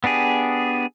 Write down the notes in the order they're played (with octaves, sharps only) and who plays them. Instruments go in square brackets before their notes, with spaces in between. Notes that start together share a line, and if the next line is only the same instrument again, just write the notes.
[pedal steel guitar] B3 D4 G4 G#4